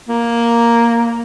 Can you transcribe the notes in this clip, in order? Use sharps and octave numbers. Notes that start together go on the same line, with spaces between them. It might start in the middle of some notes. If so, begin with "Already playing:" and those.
A#3